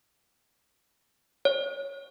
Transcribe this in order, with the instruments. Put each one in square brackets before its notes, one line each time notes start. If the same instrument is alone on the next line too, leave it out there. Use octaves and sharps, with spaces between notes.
[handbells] C#5